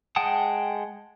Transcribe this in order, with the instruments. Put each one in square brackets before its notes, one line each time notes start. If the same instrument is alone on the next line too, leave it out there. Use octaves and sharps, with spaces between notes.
[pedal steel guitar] G#3 F#5 G5 A5 D#6